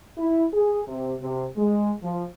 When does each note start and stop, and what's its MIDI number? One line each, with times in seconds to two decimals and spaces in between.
0.18 0.45 64
0.54 0.81 68
0.88 1.14 48
1.21 1.46 48
1.57 1.93 56
2.02 2.25 53